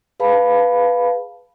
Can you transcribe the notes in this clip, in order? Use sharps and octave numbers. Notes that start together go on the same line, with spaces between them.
G#4 B4 F5 A5 B5